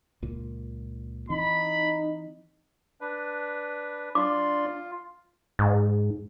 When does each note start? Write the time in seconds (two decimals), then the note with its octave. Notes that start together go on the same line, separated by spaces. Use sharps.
0.22 C#2 A#2
1.30 E3 C4 D#4 B5
3.01 D4 B4
4.15 D4 F4 D5 C6 D6
5.59 G#2